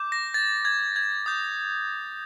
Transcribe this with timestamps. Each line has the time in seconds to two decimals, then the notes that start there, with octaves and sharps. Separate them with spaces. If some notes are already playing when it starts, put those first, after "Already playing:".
Already playing: D6 G6
0.12 A#6
0.34 A6
0.65 G#6
0.96 G#6
1.26 D#6 G6